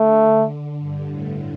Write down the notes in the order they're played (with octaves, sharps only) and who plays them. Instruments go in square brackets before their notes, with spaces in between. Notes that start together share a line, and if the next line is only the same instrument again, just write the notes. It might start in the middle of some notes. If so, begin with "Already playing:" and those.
Already playing: [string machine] D3 [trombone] A3
[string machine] G2
A2